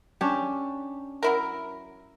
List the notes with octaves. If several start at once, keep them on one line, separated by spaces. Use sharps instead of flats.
C#4 D4 G4 C#5
F#3 E4 A#4